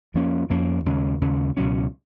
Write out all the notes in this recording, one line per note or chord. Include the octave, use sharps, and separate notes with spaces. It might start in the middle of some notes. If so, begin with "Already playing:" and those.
F2 F3 A#3 C#4
F2 F3 A#3 C#4
D#2 C#3 G#3 C#4
D#2 C#3 G#3 C#4
C#2 B2 F#3 C#4